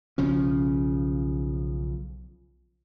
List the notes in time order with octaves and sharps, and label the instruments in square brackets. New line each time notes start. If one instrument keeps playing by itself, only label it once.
[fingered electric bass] B1 C#3 F3 C#4